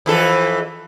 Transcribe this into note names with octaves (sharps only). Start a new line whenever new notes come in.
F2 E3 A4